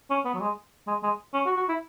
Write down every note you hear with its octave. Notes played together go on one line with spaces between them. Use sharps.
C#4
B3
F#3
G#3
G#3
G#3
C#4
F#4
F#4
E4